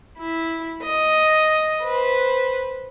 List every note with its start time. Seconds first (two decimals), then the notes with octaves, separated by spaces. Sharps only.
0.18 E4
0.83 D#5
1.82 B4 C5